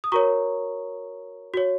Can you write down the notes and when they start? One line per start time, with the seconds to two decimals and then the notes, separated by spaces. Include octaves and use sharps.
0.04 D#6
0.12 F#4 A#4 C#5 A#5 C#6
1.54 F#4 C#5